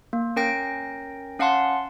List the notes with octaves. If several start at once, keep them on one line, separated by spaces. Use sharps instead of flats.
A#3
C#4 A#4 G5 A#6 D7
C#4 F5 F#5 A5 C6